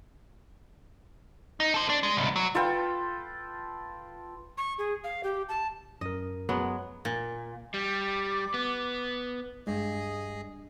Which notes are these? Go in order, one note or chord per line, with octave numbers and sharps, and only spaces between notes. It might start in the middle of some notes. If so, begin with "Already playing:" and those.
D#4
A4 C5
D4
G#3
C2 G#2
F#3
F4 A4 B4 G5
C#6
G#4
F5
G4
A5
F#2 A#4 D#5
F#3 G#3 B3
A#2
G3 D6
B3
G2 G#3 G#4 D#5